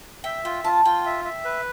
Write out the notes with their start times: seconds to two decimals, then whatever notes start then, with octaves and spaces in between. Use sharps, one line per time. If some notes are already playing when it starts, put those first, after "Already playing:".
0.24 E5 G5
0.45 F4 G5
0.64 F4 A5
0.85 F4 G5
1.05 E5
1.25 E5
1.44 B4